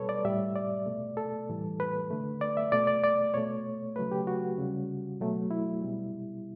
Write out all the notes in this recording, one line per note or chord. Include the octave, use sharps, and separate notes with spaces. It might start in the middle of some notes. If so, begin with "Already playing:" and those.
Already playing: B2 G3 A4 B4 C#5
D5
A2 G3 E5
D5
B2 A3
A4
A2 E3 G3
B4
D3 A3
D5
E5
B2 A3 D5
D5
D5
B2 A3 C#5
C#3 F#3 A3 B4
G4
F#4
C#3 G3
B2 F#3 A3
E4
B2 G3